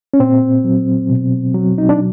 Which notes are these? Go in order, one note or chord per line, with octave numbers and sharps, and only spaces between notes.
C#4
A#2 C4
F#3
B2
F#3
D#4
D4